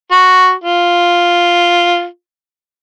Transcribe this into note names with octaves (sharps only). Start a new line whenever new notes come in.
F#4
F4